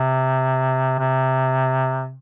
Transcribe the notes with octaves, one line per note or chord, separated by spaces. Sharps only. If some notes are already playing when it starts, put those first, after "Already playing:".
Already playing: C3
C3